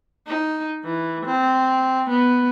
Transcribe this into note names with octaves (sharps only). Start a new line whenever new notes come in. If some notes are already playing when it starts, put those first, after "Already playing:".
D#4
E3
C4
B3